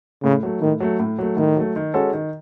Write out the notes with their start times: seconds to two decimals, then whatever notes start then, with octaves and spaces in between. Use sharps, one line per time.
0.23 A2 C#3
0.43 F#3 A3
0.61 A2 D#3
0.80 F#3 A3
1.00 A2
1.19 F#3 A3
1.37 A2 D#3
1.56 F#3 A3
1.76 D#3
1.94 G#3 C#4 F#4 A4
2.13 D#3